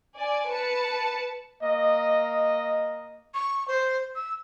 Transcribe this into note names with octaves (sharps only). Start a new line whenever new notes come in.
D5 G#5
B4 A5 C#7
A#3 D#5
C#6
C5
E6